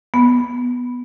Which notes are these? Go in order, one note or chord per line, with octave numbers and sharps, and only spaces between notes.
B3